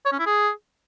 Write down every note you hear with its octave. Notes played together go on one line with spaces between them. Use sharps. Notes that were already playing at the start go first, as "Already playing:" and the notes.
C#5
C#4
E4
G#4